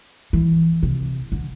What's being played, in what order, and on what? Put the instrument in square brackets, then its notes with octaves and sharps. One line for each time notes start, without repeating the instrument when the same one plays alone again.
[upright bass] E3
C3
D3